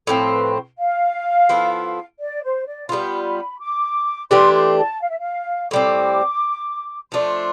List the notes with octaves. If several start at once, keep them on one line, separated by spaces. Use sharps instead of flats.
A2 F3 C4 A4
B4
F5
F3 B3 E4 A4
D5
C5
D5
G3 B3 F4 B5
B5
D6
E3 A3 D4 G4 C6
C6
A5
F5
E5
F5
A2 G3 C4 D6
F3 A3 D4 C6